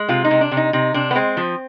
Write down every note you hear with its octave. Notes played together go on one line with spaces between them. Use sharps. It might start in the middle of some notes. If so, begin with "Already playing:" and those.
Already playing: G#3
C3 F4
D#4
C3
D4
C3
D#4
C3 D#4
C3 D4
B3
G#3 C4
F3